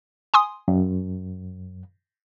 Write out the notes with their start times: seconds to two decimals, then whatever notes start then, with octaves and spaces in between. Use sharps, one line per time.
0.34 G#5 C6 D#6
0.68 F#2